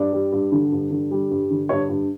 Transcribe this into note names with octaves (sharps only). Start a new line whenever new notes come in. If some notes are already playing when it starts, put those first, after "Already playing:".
Already playing: G2 D5
G3
G2
D3
G2
D3
G3
G2
D3
G2 C#5
G2